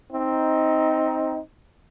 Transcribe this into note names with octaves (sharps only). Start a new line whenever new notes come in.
C4 D#4